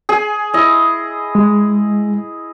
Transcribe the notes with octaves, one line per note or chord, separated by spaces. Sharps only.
G#4 G#5
E4 D#5
G#3